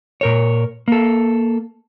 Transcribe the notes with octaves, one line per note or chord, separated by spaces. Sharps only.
A#2 A#4 C#5
A#3 A4